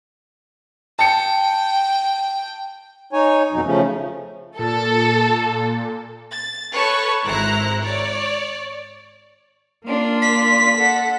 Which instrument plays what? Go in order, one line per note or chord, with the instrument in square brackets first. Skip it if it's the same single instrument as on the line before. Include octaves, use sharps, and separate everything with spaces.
[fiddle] G5 [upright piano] A5 C#7
[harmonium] D#4 C#5 G#5
F2 B2 F#3 D#4
C#3 F3 A3 C#4
[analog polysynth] A#2 [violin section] A4
[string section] A6
A4 B4 C#5 A5 C#6
G#1 E4 C5 A#5 F#6
C#5 D5
[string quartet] A#3 D4 F4
[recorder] B6
[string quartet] A4 F#5